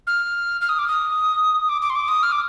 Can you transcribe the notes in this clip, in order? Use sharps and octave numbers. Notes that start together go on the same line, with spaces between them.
F6
F6
D#6
D6
D#6
D6
D6
C6
D6
D#6
F6
D6